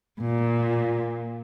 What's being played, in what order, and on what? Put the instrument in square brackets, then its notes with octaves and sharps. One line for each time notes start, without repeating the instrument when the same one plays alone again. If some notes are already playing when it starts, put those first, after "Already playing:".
[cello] A#2